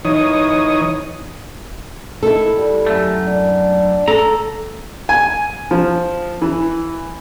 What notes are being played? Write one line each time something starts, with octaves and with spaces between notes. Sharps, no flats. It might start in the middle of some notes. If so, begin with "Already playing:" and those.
E3 D#4 C#5 D#6
D#3 E4 A4
G3
F#2 A3
D4
A4 A#5
G#5
F3
E3